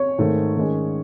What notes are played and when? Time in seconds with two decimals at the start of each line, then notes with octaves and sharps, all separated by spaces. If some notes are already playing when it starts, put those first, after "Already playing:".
Already playing: C#5
0.19 G#2 D#3 A3
0.56 D#3 G#3 C#4